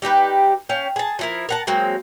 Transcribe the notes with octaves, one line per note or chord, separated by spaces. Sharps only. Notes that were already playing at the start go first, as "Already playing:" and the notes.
G3 D#4 G4 B4
C#4 F5 G5
G#4 A5
F3 E4 A#4
A#4 F#5 A5
F#3 G#3 A#3 C4